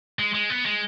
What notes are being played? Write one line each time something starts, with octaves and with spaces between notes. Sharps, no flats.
G#3
G#3
B3
G#3